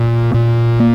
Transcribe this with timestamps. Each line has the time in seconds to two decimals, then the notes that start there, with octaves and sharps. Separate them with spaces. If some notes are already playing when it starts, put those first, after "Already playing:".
Already playing: A#2
0.34 A#2
0.80 A#3